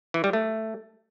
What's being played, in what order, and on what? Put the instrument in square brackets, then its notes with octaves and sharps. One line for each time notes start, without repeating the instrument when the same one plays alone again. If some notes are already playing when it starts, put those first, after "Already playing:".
[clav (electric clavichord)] E3
G3
A3